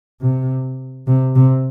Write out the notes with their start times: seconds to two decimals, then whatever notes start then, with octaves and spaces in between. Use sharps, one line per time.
0.21 C3
1.07 C3
1.36 C3